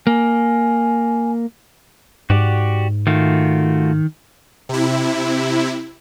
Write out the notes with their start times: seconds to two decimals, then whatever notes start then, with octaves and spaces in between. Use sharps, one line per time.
0.07 A#3 G#5
2.30 G#2 F#4 G4 D5
3.07 D#3 A3 F4 F#4
4.69 C3 E4